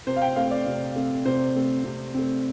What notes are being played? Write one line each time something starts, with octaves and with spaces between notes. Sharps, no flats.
C3 C5
F5
G5
A3 C4 F5
D5
C3
A3 C4
C3 C5
A3 C4
C3
A3 C4